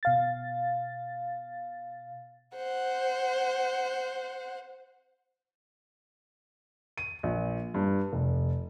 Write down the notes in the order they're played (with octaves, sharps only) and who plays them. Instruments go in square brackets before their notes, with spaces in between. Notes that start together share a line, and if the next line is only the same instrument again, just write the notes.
[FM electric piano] B2 F5 A6
[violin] C5 F#5
[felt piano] D#7
A#1
G2
F1